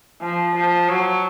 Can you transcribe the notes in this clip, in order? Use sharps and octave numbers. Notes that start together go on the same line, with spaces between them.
F3
F3
F#3